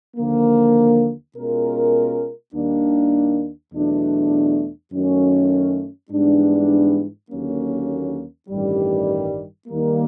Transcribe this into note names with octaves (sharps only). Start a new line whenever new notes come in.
D#2 D3 F3 A#3
B2 G#3 C#4 F4 A#4
D#2 D#3 G3 A#3 D4
E2 B2 F#3 A3 D4
F#2 D#3 F#3 A3 C#4
G#2 E3 G3 B3 D4
D#2 D3 F#3 A#3 C#4
A1 G2 D#3 G3
D#2 D#3 G3 A#3